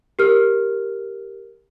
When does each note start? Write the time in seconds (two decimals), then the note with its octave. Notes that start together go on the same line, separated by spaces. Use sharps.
0.19 G4 A#4 F6